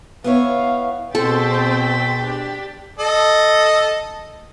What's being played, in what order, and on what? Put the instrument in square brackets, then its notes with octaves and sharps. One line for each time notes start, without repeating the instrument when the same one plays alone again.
[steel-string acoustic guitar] B3 E4 C#5 [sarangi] F5
[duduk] B2 [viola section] C4 G#4 C5 [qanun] A4 [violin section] G5 A6 B6
[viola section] D4 G4
[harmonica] A4 D#5